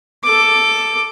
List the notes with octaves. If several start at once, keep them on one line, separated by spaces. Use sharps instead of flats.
A4 D6